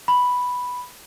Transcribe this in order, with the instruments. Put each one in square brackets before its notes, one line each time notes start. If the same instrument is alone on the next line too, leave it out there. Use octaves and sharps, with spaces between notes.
[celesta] B5